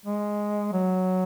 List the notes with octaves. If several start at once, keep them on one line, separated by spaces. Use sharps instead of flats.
G#3
F#3